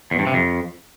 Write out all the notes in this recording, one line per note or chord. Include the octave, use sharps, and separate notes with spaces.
E2
G2
C3
F2